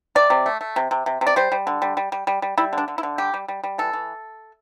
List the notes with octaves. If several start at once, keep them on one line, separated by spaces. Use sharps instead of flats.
C3 D5
C3
A3
A3
C3
C3
C3
C3
D5
G3 C5
G3
D3
G3
G3
G3
G3
G3
G3 E4
D3
D4
D3
E4
D3
G3 G4
G3
G3
G3
E3 A4
E3